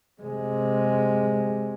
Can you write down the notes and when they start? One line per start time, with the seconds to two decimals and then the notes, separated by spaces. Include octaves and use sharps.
0.21 C3 G#3